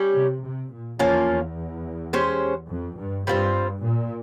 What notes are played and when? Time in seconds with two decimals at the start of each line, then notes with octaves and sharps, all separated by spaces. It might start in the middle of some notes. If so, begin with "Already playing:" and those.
Already playing: G3 C#4 G4
0.15 C3
0.43 C3
0.71 A#2
0.99 E2 F3 A#3 C#4 F4
1.28 E2
2.13 G#3 C#4 G4 C5
2.70 F2
2.98 G2
3.27 G2 G3 C4 F4 C5
3.84 A#2